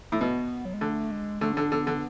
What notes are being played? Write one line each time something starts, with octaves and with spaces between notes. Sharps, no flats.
A2
B2 B3
F#3
G#3
D3 A3
G#3
D3 A3
C#4
D3 D4
D3 B3
D3